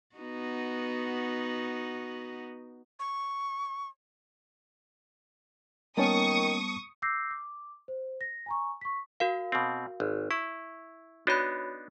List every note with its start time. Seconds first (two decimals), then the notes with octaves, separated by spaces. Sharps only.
0.16 B3 D#4 F#4
2.99 C#6
5.97 D#3 G3 A#3 B3 C#4 A5 C#6 D#6
7.02 D6 E6 G6 A#6 C7
7.31 D6
7.88 C5
8.21 A#6
8.46 G#5 A#5 C#6
8.81 C#6 B6
9.20 F#4 A#4 F5
9.52 B2 C4
10.00 G#1
10.31 E4 C#6
11.27 B3 D4 D#4 F#4 C#5 B5